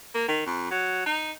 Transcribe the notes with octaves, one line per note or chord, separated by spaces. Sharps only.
A#3
D#3
F2
F#3
D#4